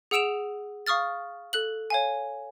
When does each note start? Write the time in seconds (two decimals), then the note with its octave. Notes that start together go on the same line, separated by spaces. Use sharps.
0.11 G#4 F#5 E6 D7 E7 F7
0.87 F5 C#6 D#6 F6 A6
1.53 A4 F#6 F#7
1.90 C#5 F5 G#5